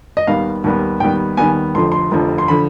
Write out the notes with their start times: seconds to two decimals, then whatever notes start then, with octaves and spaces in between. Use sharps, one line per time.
0.17 D#5
0.27 D#2 D#3 G3 B3 F5
0.64 D#2 D#3 G3 B3
1.00 D#2 D#3 G3 B3 G5
1.37 D#2 D#3 G3 B3 G#5
1.75 F1 F2 D3 F3 C6
1.92 C6
2.11 F1 F2 D3 F3
2.38 C6
2.48 D3 F3 B5